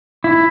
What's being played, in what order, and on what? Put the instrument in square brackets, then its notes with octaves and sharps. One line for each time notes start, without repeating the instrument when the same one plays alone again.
[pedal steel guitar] E4